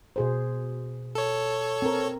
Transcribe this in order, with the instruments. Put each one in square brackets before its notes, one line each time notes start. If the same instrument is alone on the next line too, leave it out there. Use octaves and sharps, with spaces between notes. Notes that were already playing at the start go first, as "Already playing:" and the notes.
[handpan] B2 G#4 C5
[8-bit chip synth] A4 C#5
[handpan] C4 A#4